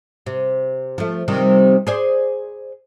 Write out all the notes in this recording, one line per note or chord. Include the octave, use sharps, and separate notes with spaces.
C3
F3 A3
C3 D#3 G3
G#4 C5 D5